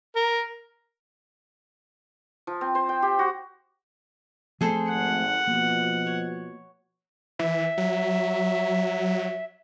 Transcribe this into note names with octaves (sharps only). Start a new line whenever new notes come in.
A#4
F3
C4
C5
G5
G4
F#4
F3 A3 C4 G#4 A4 C5
G#1 F#5
B2 F3 A#3
C#5
E3 E5
F#3